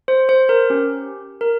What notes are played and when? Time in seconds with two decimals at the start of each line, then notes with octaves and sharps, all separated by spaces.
0.08 C5
0.29 C5
0.49 A#4
0.70 C#4 G4
1.41 A#4